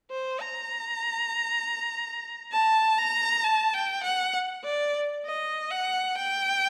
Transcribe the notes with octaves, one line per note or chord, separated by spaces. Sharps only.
C5
A#5
A5
A#5
A5
G5
F#5
D5
D#5
F#5
G5